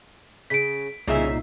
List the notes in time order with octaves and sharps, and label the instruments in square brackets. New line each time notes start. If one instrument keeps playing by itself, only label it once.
[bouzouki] C#3 [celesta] B6 D7
[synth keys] C2 E5 B6 [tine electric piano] A#2 D#4 C7 [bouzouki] C#3 C#4